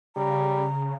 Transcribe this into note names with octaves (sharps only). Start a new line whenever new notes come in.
C#3 G3 A#5